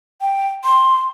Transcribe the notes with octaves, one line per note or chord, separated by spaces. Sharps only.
G5
C6